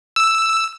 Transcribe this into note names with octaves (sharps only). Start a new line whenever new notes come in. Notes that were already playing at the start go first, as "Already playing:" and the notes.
E6